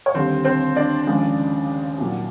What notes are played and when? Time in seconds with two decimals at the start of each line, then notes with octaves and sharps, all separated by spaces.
0.06 C#5
0.15 D#2 D3 G3 C4 C5
0.45 C4 C5
0.76 D4 D5
1.06 D#2 C#3 F3 G#3
1.98 C2 A#2 F#3